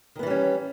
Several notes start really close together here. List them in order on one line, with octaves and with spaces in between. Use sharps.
D#3 B3 E3 G3 C#4